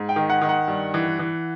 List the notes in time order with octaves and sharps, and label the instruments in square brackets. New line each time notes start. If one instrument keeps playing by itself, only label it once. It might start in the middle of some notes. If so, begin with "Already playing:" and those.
Already playing: [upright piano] G#2
G5
D#3
F#5
D#3
F#5
G2
E3
E3